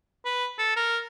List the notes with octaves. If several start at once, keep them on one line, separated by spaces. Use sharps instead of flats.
B4
A4
A#4